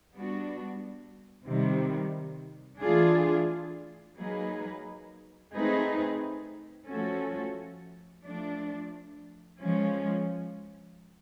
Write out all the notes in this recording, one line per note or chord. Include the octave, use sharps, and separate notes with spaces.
G3 B3 D4 F#4
C3 D#3 G3
E3 A3 D4 F4 G#4
F#3 A#3 D#4 G#4 B4
A3 C4 D#4 G#4 B4
F3 A3 C#4 F#4 A4
F3 A3 D4
F3 G#3 C#4